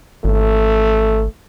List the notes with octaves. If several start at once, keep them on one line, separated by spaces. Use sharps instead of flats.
G#1 A3